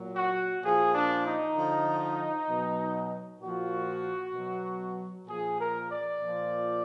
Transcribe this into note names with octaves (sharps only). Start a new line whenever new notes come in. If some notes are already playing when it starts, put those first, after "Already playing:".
Already playing: A#2 F#3
F#4
A#2 F3 G#4
D4
D#4
D3 F3
B2 F#3
A#2 F3 F#4
B2 F#3
A#2 F3 G#4
A#4
D5
A#2 F3